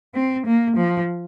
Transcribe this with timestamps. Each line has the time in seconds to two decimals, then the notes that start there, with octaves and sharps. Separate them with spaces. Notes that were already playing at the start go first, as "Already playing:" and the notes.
0.14 C4
0.46 A#3
0.78 F3